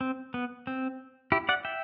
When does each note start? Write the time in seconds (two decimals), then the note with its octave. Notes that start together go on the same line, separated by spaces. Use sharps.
0.01 C4
0.34 B3
0.67 C4
1.32 E4 G4
1.49 D5 F#5
1.65 E5 G5